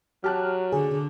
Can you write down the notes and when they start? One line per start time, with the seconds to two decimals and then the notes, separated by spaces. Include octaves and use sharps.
0.24 F#3 G4 A5 F6 F#6
0.72 D3 G#4